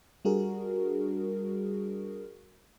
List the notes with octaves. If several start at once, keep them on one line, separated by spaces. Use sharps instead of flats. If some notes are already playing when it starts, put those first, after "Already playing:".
G3 D4 F#4 G#4 A#4